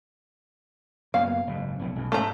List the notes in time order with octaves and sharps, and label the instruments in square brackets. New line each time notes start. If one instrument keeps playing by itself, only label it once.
[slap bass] F#2 A#3 B3 [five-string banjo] F5
[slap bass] F#1 G#2
F1 B1 A2
B1 E2
[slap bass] G#2 [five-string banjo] A3 A#5